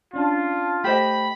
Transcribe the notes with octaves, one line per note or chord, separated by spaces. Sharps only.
C#4 D4 F4 A5
A3 G4 C5 D#5 B5